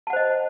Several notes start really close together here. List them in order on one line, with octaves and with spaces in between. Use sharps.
A5 F#5 C5 D#5